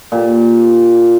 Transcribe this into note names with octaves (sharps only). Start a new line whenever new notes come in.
A#2 G4